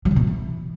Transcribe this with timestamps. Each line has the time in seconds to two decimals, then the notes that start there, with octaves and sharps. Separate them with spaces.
0.05 F#3
0.11 D#3
0.16 B2
0.22 G2
0.27 E3